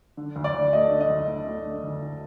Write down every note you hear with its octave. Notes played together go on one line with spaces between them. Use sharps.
D3
D2
D5
D2
A3 D#5
D3
D#5
D2
D2
A3
D3
D2
D2